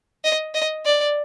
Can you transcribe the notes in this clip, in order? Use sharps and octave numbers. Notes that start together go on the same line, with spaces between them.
D#5
D#5
D5